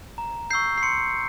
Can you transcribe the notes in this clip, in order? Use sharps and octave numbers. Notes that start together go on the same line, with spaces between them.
A#5
C#6 E6 G6 C7
C7
C6 C#7